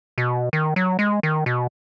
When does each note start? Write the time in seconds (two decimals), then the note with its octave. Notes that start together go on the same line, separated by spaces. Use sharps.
0.18 B2
0.53 D#3
0.76 F#3
0.99 G#3
1.23 D#3
1.46 B2